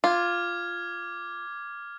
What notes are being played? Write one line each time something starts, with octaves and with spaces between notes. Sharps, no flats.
F4 D6 F6 G#6